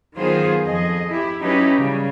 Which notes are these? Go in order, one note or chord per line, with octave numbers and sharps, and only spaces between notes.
D#3 F#3 B3 F4 G#4 C5
F2 G#4 D#5
E4 G4
F#3 C#4 D#4 E4 G4 B4
C#3 G3